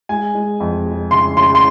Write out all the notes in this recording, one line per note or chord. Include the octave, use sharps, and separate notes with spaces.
G#3 G#5
G#3
F2
G#3
C#3 C6
C#3 C6
C6